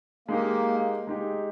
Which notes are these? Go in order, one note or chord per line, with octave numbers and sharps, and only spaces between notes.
G#3 A#3 D#4 G4
G#3 D#4 G4